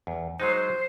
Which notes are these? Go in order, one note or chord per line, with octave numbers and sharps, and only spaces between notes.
E2
F#3 G#3 D#4 C5
C5